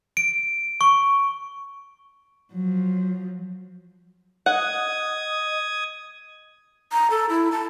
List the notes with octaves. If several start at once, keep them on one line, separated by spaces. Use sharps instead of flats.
D7
C#6
F3 F#3
D#5 F#5 D#6 G#6
A#5
A4
E4
A5